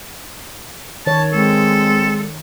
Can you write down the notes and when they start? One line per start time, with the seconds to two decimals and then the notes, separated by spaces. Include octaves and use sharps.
1.06 D#3 C#5 A5
1.33 G#3 C4 A4